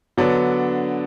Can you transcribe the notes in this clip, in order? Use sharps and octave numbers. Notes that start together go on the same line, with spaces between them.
D3 F#3 B3 D4